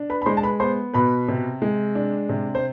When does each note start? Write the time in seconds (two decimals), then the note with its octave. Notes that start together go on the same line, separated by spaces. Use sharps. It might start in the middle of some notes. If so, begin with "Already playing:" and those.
Already playing: D4
0.10 B4 B5
0.22 B5
0.26 G#3 C5 C6
0.37 A5
0.43 B4 B5
0.60 B3 C5 C6
0.94 B2 B4 B5
1.28 C3
1.62 G#3
1.95 D4
2.29 C3
2.55 C5